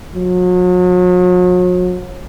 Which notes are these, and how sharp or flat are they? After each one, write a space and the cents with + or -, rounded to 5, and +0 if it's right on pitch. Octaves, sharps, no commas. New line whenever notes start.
F#3 -40